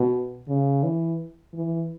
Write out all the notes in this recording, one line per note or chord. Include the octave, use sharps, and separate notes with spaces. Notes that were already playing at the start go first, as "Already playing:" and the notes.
Already playing: B2
C#3
E3
E3